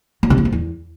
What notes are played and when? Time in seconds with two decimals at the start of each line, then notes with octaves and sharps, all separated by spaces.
0.23 F#3
0.30 C3
0.38 E3
0.45 F3
0.52 E2